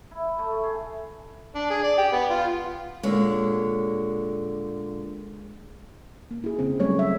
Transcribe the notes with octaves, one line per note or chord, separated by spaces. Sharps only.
E4
A3
G#4
D4
G#4
D5
G4
B3
F4
A#2 D3 G#3 A#3 C#5
A#3
E4 G#4
C#3 C4
F#3 G3 A3 C#4 C#5
E5